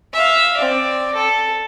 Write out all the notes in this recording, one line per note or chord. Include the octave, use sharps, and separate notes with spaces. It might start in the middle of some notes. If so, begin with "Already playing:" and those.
E5 F5
C4 D5
A4